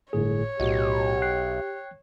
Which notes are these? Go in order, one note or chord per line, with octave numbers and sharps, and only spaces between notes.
G1 A2 G#4 C#5
B1 A2 F#4 G4 D#5
G5 F#6 C7